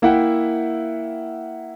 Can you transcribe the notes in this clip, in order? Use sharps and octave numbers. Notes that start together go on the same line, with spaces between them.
A#3 E4 E5 F#5 G5